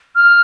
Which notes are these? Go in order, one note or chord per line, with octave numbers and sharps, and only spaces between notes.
F6